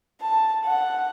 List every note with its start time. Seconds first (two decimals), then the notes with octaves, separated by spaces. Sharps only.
0.21 A5
0.65 F#5